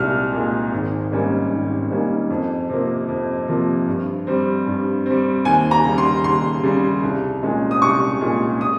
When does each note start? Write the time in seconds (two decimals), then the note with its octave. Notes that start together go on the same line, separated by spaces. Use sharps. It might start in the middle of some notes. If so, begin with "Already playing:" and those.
Already playing: C2 A#2 G#3 F6
0.33 A#2 G#3
0.72 G#1
1.12 G#2 G3 A#3 C#4
1.51 G#1
1.90 G#2 G3 A#3 C#4
2.30 F2
2.70 C3 F3 A#3
3.08 F2
3.48 C3 F3 A#3
3.87 G2
4.27 G3 C4
4.67 G2
5.06 G3 C4
5.45 D#2 G#5
5.71 A#5
5.84 C#3 G3
5.98 C6
6.24 D#2 C6
6.63 C#3 G3
7.03 C2
7.42 A#2 G#3 C#4
7.71 D#6
7.82 C2 C#6
8.21 A#2 G#3 C#4
8.61 D#6